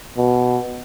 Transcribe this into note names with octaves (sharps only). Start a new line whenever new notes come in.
B2